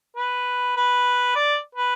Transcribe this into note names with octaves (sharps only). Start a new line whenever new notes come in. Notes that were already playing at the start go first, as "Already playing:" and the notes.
B4
B4
D5
B4